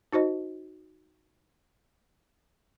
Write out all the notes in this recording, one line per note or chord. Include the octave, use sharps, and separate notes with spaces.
D#4 F#4 C5 D#5